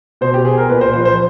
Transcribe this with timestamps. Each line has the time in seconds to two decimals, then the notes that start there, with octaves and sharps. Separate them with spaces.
0.21 B2 C5
0.34 G4
0.45 G#4
0.57 A#4
0.69 A#2 B4
0.81 C5
0.94 F3 C5
1.05 C5